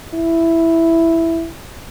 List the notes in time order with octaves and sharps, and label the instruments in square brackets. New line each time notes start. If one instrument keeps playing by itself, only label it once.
[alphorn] E4